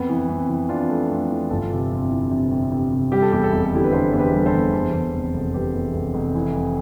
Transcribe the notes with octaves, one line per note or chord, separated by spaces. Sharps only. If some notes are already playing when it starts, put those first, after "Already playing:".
Already playing: F2 B3
E3
F2
E3
F2 D4 F4
A3
F2
E3
G1 F4 A4
C3
F2
E3
C3
F2
C3
C3
G3 G4
A4
E2 G4
A4
F1 G4
A4
D3 E4 G4
B4
D3 A4 C5
E2 C5
G4 B4
G3
A4 C5
E2
E2
E2
F1
F1
F1 G4 B4
E2
F1
F1
E3
F2